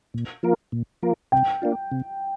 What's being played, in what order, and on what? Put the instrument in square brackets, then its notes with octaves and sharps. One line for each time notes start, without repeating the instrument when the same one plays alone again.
[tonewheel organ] A#2
F3 A#3 F4 A#4
A#2
F3 A#3 F4 A#4
[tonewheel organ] C3 [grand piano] G5
[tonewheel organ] A#3 D4 F4
C3